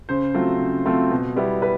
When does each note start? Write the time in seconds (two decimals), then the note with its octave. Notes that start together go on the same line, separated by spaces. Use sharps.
0.09 C#3 C5
0.34 F#3 A3 C4 F4
0.60 C#3
0.85 F#3 A3 C4 F4
1.11 B2
1.36 G3 B3 E4
1.62 B4